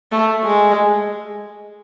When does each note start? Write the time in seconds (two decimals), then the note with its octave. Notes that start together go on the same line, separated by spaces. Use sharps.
0.12 A3
0.44 G#3